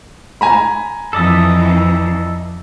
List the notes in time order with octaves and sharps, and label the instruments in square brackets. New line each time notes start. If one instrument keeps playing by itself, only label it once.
[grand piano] G#5 A#5 B5
[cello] F2 E3 [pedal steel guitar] A4 D5 D#5